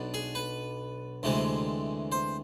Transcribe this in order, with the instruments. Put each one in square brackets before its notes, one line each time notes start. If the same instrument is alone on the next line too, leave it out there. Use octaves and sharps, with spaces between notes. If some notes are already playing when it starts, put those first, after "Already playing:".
Already playing: [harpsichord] B1 B2 B3 D4
G#4
B4
D2 C3 E3 G#3
C5